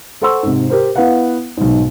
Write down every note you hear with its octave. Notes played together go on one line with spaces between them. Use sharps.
A4 C5 F#5 C6 C#6 E6
G#2 C3
G4 A#4 C5
B3 E4 B4 F5 F#5
B1 G#2